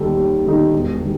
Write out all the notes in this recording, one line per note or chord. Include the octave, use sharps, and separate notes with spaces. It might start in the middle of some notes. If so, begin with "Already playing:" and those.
Already playing: D#2 D#3 G3 D#4 A4
D#2
D#3 G3 D#4 A4
E1
D#3 G3